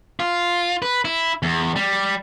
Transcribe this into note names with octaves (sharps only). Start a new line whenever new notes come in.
F4
B4
E4
E2
G3